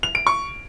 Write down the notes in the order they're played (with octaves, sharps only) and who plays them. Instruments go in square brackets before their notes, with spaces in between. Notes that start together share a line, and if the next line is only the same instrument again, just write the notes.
[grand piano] F7
D7
C#6